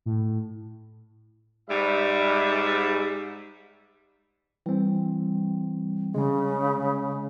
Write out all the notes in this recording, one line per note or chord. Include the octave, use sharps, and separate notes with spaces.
A2
G#2 G3 E5
E3 G3 C4
C#3 G#3 C#4